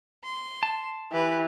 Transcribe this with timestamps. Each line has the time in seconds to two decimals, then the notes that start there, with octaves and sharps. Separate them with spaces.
0.24 C6
0.63 A5
1.12 E3 G4 B4